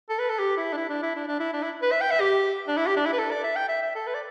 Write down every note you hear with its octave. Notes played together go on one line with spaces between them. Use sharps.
A4
B4
A4
G4
E4
D4
E4
D4
E4
D4
D4
E4
D4
E4
B4
E5
G5
E5
G4
D4
E4
G4
D4
E4
B4
A4
D5
E5
G5
E5
E5
A4
B4
D5